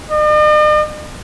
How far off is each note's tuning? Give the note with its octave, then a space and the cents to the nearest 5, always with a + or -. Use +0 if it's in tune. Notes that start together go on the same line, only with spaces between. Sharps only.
D#5 -45